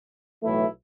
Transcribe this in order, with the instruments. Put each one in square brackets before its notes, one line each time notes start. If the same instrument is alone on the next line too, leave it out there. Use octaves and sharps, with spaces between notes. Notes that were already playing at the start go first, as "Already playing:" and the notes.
[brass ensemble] B1 A2 E3 A3 E4